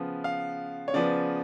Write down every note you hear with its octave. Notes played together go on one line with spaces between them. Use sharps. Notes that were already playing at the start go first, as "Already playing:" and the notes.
Already playing: C#3 F3 B3
F5
C#5
C#3 F3 B3 D5